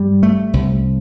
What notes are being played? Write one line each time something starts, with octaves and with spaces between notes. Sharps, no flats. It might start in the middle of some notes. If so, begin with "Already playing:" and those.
Already playing: G2 G3
A3
C2